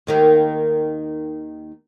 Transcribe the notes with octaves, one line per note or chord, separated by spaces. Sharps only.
D#2 D#3 A#3